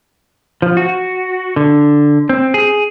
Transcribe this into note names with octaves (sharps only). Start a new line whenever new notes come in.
F3
F#4
D3
C4
G#4